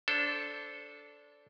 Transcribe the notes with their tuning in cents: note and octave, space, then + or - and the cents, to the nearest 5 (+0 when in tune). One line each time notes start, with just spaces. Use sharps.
D4 -20 A4 +0 C5 +0